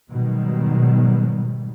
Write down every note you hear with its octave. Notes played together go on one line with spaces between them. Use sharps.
G#2 B2 D#3 F#3 G3